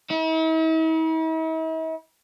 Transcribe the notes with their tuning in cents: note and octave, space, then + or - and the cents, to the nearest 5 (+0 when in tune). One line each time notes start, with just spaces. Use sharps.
E4 -45